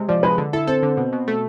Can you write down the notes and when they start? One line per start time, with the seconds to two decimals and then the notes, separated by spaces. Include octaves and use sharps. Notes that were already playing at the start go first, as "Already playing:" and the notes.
Already playing: C3 G#3
0.08 F3 D5
0.23 G#3 B4
0.38 D3
0.53 E4 A4
0.67 C4 A4
0.83 D3
0.97 B2
1.13 B2
1.28 A3